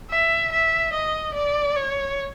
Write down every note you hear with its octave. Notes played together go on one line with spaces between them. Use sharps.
E5
E5
D#5
D5
C#5